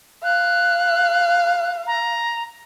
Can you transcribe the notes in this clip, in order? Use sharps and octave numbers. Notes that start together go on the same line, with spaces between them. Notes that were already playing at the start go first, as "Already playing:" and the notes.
F5 F#6
A#5